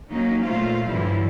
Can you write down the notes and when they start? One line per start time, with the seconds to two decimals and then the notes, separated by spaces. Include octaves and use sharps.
0.12 F#3 A#3 C#4 D#4
0.42 A#2 A3 F4 C5 F5
0.85 G2 D3 E3 F#3 G3 E4